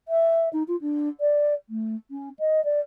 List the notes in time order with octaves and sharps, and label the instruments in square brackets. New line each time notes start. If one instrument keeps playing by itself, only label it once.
[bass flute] E5
D#4
F4
D4
D5
A3
C#4
D#5
D5